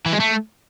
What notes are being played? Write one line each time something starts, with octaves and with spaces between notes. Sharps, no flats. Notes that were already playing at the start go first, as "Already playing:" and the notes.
E3
G#3
A3